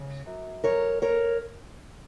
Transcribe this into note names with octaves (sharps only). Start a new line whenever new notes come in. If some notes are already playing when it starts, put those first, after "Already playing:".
Already playing: C#3
F#2
F#2 A#4 C#5
A#4 C#5